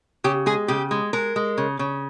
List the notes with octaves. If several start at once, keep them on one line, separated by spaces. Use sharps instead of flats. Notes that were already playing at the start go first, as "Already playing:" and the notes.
C#3 G4
G#3 G#4
C#3 G4
G#3
G#3 A#4
G#3
C#3
C#3